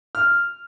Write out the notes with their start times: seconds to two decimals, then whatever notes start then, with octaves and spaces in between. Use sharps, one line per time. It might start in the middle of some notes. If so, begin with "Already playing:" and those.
0.15 F6